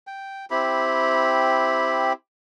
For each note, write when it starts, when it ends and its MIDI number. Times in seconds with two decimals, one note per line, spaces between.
0.07 0.45 79
0.51 2.13 60
0.51 2.13 64
0.51 2.13 67
0.51 2.13 83